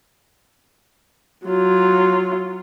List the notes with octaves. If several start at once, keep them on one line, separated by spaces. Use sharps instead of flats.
F#3 F4